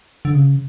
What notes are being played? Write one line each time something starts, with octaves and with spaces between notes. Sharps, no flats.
D3
C#3